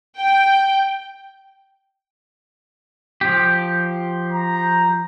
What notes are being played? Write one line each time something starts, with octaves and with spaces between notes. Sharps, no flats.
G5
F3 G4
A#5